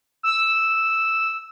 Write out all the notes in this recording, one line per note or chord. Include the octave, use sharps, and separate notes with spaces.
E6